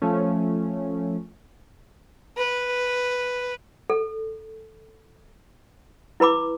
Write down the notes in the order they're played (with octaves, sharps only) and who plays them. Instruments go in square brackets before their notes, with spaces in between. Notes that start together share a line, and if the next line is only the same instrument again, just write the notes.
[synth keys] F3 A3 C#4
[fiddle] B4
[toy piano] A4
E4 B4 B5 D6